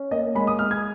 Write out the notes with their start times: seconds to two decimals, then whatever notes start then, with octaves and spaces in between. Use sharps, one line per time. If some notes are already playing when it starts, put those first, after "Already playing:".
Already playing: C#4
0.11 A#3 D#5
0.35 G#3 B5
0.47 D#6
0.59 G#3 F6
0.71 G#6